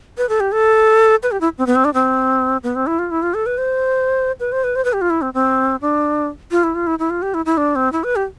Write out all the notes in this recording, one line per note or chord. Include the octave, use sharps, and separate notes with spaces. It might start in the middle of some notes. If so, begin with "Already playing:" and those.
B4
A4
G4
A4
B4
G4
E4
C4
B3
C4
D4
C4
B3
C4
E4
F4
E4
F4
A4
B4
C5
B4
C5
B4
C5
B4
G4
F4
E4
C4
C4
D4
F4
E4
F4
E4
E4
F4
G4
E4
E4
D4
C4
E4
B4
G4